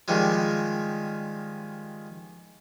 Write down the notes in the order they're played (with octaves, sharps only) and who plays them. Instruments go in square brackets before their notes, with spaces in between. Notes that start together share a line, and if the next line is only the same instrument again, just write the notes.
[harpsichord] D#3 F3 G3 G#3